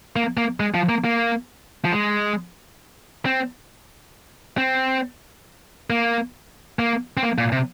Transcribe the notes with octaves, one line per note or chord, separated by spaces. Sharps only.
A#3
A#3
G#3
F3
A#3
A#3
F3
G#3
C4
C4
A#3
A#3
C4
A#3
A#2
C3